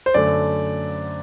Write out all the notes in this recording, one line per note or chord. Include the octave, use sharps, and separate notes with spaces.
C5
F#2 D3 A3 D5